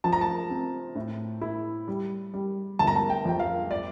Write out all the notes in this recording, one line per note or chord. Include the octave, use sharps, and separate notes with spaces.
F3 A5
A#5
A5
C4
A2
E4
G3
G3
G1 A5
A#5
A5
G5
F2 G5
F5
D5